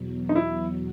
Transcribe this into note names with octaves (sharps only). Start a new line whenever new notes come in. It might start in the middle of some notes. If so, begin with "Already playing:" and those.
Already playing: E2 B2 F#3
D#4
E4